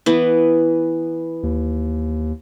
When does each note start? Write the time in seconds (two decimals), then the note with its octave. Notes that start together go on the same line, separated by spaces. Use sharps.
0.06 E3 B3
1.43 D#2